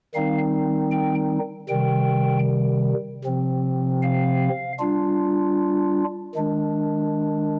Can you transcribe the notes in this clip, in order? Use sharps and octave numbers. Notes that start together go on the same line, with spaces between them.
D#3 G3 C4 D#4 F5
G5
C3 D#3 G3 G5
C3 F3 C4
F5
G3 D4 F4
D#3 G#3 D4